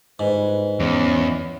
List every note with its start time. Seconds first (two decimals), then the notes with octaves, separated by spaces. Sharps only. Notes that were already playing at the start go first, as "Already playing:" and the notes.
0.19 G1 G#2 B4
0.80 E2 C#4 C#5